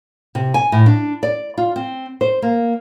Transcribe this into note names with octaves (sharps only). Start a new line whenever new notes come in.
C3
G#5
A2
D4
D5
F4
C4
C5
A#3